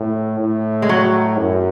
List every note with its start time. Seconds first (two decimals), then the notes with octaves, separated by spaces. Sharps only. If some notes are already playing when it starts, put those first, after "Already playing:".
Already playing: A2
0.39 A2
0.82 G#3
0.89 F#3
1.39 F#2